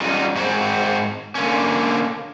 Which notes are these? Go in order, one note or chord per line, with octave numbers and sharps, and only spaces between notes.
G3 C#4 D#4 F4 F#4
G#2 C4 F#4
D3 A#3 C#4